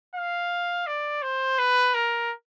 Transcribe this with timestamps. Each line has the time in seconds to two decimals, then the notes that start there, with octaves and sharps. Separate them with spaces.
0.15 F5
0.87 D5
1.22 C5
1.58 B4
1.94 A#4